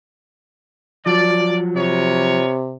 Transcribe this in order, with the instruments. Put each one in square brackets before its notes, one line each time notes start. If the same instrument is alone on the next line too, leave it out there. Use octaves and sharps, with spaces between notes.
[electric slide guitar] F3 F#3 [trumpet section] D5
[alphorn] C3 [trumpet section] B3 A#4 C#5